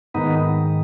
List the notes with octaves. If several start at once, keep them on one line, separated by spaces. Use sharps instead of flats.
G#2 D#3 B3 D#4